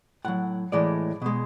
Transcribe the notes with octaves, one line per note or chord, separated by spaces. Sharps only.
A2 F#3 F#5
A2 E3 G#3 D5
B2 G#3